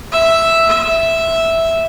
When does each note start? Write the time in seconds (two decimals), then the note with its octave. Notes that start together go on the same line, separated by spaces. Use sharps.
0.12 E5
0.69 E5